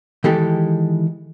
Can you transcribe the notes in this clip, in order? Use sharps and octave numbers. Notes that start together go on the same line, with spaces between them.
D#3 E3 G#3 G4 A4